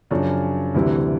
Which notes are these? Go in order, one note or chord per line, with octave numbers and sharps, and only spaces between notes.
F#2 C#3 F3 D4
D2 C3 E3 G3